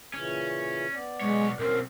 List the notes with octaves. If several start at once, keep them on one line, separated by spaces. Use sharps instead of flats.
A#2 C#3 E3 C#4
B3 D5
B1 G#3 C#5
B1 F#3 C4 C#4 A#4